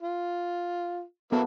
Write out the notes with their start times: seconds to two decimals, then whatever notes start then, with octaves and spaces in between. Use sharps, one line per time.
0.02 F4
1.32 F#3 A#3 B3 E4 A4